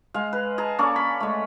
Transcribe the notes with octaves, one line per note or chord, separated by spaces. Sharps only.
G#3 F5
B4
G#4 A5 A#5
A#3 C#4 A4 D5
B5
G#3 A3